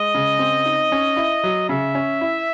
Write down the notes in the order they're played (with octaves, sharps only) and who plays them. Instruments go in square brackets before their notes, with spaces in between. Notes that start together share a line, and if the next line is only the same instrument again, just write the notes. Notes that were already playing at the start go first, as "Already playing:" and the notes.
Already playing: [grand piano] G#3 [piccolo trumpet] D#5
[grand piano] C#3
C4
D#4
C#4
E4
F#3
[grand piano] C#3 [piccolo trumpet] E5
[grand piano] C#4
E4